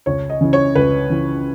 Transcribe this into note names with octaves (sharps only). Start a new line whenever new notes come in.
C#2 C#5
D#5
C#3 E3
C#5
C#2 B4
C#3 E3